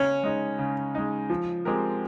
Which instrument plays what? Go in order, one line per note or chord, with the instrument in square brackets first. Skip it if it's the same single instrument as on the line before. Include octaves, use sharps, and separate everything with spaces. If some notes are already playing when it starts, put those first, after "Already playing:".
Already playing: [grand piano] C#3 [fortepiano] C#4
[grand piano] G#3 D#4
C#3
G#3 D#4
F3
G#3 C4 G4 A#4